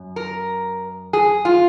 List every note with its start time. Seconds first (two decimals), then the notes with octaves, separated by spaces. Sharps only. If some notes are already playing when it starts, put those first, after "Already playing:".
Already playing: F#2
0.16 A#4
1.13 G#4
1.45 F4